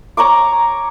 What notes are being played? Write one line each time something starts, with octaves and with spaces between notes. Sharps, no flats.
C#5 A#5 C#6 D6